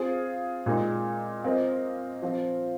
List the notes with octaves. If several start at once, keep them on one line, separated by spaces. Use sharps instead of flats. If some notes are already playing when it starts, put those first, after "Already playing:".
Already playing: C4 F4 G#4
A#2 G#3 D#4
C4 F4 A#4 D#5
F3 C4 F4